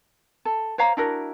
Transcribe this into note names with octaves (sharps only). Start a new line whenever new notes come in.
A4
C5 C#5 F5 A#5
D4 E4 F#4 A#4